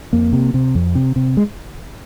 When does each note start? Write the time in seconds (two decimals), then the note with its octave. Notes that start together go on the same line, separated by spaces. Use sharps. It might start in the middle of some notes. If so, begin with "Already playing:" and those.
0.13 F2 A#3
0.33 C3
0.54 C3
0.75 F2
0.95 C3
1.16 C3
1.37 G#3